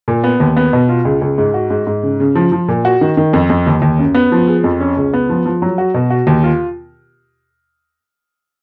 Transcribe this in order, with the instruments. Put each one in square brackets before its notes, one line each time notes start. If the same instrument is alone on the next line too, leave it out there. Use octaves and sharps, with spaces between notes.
[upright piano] A#2
B3
D#2
B3
B2
F4
C#2
C#2
G#2
F#4
G#2
G#2
C#3
C#3
F3
F3
A#2
F#4
D#3
D#3
F2
F2
D#2
D#2
F#2
B3
F3
G#4
F2
C#4
C#2
B3
F3
F3
F#3
F#4
B2
F#4
D#2
F4